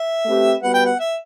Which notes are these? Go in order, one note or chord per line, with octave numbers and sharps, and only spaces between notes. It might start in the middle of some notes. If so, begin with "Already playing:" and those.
Already playing: E5
A3 C4 G4 B4
G3 B3 F#4 B4 F#5
G5
F#5
E5